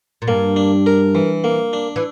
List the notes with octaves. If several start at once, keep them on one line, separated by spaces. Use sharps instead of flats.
A#2
G2 A#3
D4
A#4
E3
A#3
D4
E3